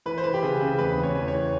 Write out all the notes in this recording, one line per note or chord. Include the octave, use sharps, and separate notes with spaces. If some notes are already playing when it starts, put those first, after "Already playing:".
E3 B4
C5
E3 B4
G4
C#3 G#4
C#3 G#4
E2 B4
E2
C#5
E2
C#5
E3